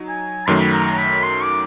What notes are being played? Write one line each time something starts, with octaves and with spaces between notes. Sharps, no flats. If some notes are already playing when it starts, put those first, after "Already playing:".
Already playing: F#3 D#4
G#5
F#2 D#3 F#3 A3 C6
B5
A#5
B5
C6
D6